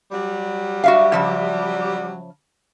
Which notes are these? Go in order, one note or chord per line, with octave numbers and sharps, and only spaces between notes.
F#3 G3
F#4 E5 F5
C#3 F3 E5